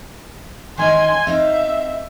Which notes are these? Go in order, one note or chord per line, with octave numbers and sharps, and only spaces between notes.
D#3 C#4 D#4 G#5 C6
C4 D#4 E5 F5